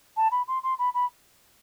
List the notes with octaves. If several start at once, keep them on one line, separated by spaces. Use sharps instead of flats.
A5
B5
C6
C6
B5
B5